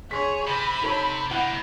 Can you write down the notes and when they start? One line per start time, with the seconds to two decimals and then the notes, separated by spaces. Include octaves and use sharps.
0.11 G#4 C#5 C6 B6
0.47 C3 B5
0.82 D#4 A4 C#5
1.31 C3 A#3 E4 F#5